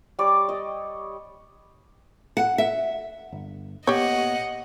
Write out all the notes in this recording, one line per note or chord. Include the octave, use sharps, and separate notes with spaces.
G3 C#5 D5 D6
D#5
F#5
E5
G1
A#2 B3 G4 C#5 D#5 F#5